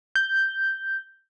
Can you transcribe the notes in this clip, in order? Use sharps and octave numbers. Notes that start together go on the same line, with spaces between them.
G6